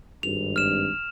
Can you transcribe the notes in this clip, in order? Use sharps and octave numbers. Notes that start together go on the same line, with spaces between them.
G#1 G2 F7
F6 E7